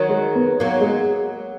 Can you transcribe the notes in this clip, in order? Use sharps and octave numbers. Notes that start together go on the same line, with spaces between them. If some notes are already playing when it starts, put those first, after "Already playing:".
Already playing: D#3 F#3
G#3
B3
F#3 A#3
G#3